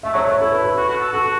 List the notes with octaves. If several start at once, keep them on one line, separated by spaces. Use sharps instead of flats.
A3 E5
F#3 C#5
A3
C#5
E4 A4
B4
B4
F#4
F#4
A4
F#4 A4